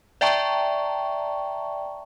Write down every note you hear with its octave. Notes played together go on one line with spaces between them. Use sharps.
D5 E5 G5 A5 A#5 C#6